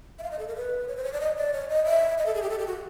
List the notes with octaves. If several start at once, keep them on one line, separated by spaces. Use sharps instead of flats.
E5
F5
D#5
A4
A#4
B4
C#5
C5
C#5
D5
D#5
D5
C#5
D#5
E5
D#5
A4
G#4
G4
A4
G4
F#4